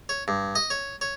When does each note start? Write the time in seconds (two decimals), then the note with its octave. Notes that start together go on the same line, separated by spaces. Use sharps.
0.09 C#5
0.28 G2
0.55 D#5
0.70 C#5
1.01 C#5